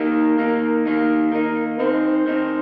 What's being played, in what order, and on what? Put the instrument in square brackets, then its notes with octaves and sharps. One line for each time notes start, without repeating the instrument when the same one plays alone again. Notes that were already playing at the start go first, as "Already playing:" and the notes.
Already playing: [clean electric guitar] D#3 A#3 D#4 [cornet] A#4
[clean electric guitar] D#3 A#3 D#4
D#3 A#3 D#4
[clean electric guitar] D#3 A#3 D#4 [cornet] A#4
[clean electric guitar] D#3 C4 D#4 [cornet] C5
[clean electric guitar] D#3 C4 D#4